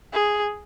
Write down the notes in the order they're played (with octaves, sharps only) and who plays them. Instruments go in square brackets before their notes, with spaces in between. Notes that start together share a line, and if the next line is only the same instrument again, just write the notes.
[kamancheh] G#4